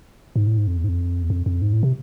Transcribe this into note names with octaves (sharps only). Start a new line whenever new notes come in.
G#2
A2
G#2
F2
E2
G#2
F2
E2
F2
F2
G#2
A2
C3